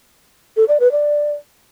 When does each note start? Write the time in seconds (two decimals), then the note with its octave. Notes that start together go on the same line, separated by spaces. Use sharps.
0.57 A4
0.68 D5
0.80 B4
0.91 D5